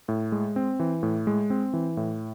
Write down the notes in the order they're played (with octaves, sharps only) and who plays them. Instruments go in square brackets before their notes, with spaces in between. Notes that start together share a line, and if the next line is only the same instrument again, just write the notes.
[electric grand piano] A2
G#3
C4
E3
A2
G#3
C4
E3
A2